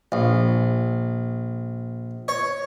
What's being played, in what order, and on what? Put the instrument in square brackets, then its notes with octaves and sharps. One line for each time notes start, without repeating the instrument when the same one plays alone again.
[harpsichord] A#1
C#5